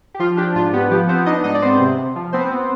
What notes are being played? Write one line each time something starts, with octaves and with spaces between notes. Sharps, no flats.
G4
F3 F4
D4 G4
G#2 F4
B3 G4
F3 G4
B3 C4 C5
D4 D#4 D#5
G#2 D#4 D#5
D5
B3 C4 C5
C3
C3
F3
B3 C4 C5
B3